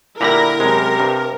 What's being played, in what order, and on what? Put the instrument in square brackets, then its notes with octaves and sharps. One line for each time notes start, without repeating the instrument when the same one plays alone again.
[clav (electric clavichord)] A#2 D3 G3 [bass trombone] E4 [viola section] A#4 [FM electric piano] A#5 B5 A#6
[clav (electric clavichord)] F#2 G#3 [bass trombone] C3
[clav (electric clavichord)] G2